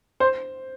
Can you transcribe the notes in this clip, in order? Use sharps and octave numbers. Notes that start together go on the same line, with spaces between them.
C5